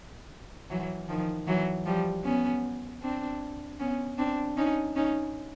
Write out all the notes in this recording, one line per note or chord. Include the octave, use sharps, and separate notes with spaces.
E3 F#3
D#3 F3
E3 F#3
F3 G3
B3 C#4
C4 D4
B3 C#4
C4 D4
C#4 D#4
C#4 D#4